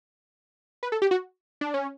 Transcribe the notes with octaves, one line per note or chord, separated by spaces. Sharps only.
B4
A4
G4
F#4
D4
C#4